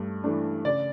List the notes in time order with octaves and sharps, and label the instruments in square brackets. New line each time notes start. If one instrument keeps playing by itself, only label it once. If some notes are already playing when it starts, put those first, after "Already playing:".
Already playing: [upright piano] G2 A3
E3 A3 D4
C#3 D5